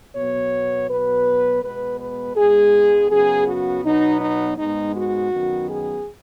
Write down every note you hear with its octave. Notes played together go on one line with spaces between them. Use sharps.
B2 F#3 B3 C#5
B2 F#3 B3 B4
B2 G#3 B3 B4
B4
G#2 G#3 B3 G#4
F#2 C#3 B3 G#4
F#4
B2 F#3 B3 D#4
D#4
G#2 G#3 B3 D#4
F#4
F#2 D#3 B3
G#4